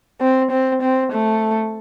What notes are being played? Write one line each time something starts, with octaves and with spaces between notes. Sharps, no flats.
C4
C4
C4
A3